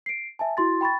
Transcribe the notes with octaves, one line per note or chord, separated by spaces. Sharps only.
C7 D7
E5 G#5 A5
E4 F#4 C6 A6
G5 B5 C#6 A6